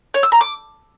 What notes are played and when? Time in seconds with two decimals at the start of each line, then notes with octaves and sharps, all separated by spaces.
0.14 C#5
0.23 E6
0.32 A#5
0.41 D6